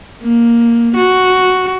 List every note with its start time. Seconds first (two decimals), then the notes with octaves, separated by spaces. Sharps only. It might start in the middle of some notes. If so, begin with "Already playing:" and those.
0.22 A#3
0.96 F#4